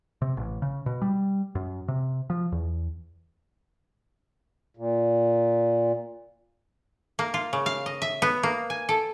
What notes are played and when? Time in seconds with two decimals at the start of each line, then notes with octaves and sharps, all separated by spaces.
0.22 C3
0.37 A1
0.62 C#3
0.86 B2
1.02 G3
1.55 F#2
1.88 C3
2.30 F3
2.52 E2
4.77 A#2
7.19 A#3
7.34 F4
7.53 C#3
7.66 F5
7.86 D#5
8.02 E5
8.22 B3
8.43 A#3
8.70 G#5
8.89 A4